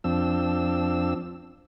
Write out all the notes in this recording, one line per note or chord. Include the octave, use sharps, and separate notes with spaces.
F2 F3 C4 D4 E6